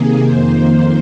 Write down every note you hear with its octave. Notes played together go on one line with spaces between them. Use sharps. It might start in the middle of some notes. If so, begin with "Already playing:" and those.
Already playing: C3 D#3 A#3 G#4
F2 D#3 A#3 C5